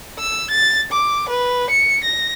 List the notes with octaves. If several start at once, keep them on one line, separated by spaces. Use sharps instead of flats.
E6
A6
D6
B4
C#7
A#6